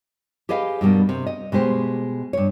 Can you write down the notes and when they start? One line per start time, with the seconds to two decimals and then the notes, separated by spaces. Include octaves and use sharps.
0.49 G4 G#4 B4 D#5 F5
0.81 G2 B2 G3 A#3
1.09 C3
1.27 D#5
1.52 B2 G#3 G4 C5
2.33 G2 C#5